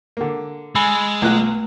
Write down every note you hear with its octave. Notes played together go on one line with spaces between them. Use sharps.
D3 A#3
G#3 G#5 B5 E6
B1 A3 F4 F#6